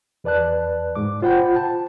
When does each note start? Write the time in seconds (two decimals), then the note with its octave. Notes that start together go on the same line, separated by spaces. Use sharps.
0.24 E2 B4 D5 A5 F#6
0.95 G#2 D6
1.22 F4 C5 F#5 G5 B5 G6
1.56 A5